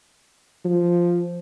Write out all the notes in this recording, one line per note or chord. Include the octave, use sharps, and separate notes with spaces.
F3